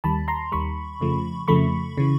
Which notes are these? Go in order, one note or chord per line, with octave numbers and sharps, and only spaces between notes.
D#2 D#3 G3 A5 B5
A#5 C6
D#2 D#3 G3 B5 C#6
F2 C#3 F3 A3
F2 C#3 F3 A3 B5 C#6
C#3 E3